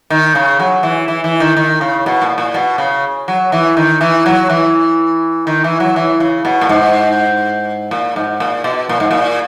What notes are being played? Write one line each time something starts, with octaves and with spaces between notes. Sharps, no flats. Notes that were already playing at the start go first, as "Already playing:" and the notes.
D#3
C#3
F#3
E3
E3
E3
D#3
D#3
C#3
B2
A#2
A#2
B2
C#3
F#3
E3
D#3
E3
F#3
E3
D#3
E3
F#3
E3
C#3
B2
A#2
G#2
A#2
G#2
A#2
B2
A#2
G#2
A#2